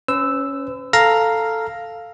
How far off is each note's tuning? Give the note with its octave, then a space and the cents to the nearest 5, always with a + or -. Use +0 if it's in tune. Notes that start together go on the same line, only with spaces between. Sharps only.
C#4 +0 B4 +45 E6 +0
A4 +5 F5 +0 A#5 +0